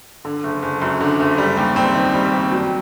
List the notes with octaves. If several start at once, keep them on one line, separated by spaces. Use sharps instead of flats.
D3
F#1
F#1
F#2
D3
F#1
G3
D#2
C4
D#3
G3
D#2
F#3